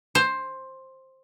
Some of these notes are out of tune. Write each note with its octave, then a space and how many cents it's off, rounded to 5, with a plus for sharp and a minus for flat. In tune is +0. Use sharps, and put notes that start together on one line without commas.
C5 +10